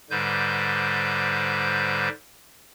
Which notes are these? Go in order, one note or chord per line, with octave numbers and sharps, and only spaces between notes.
G#2 D3 G3 B4 C5 G6